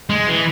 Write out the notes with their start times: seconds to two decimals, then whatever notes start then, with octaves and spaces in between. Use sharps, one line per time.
0.10 G#3
0.27 E3